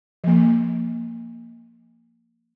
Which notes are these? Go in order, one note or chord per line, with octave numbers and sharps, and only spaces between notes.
F3 A#3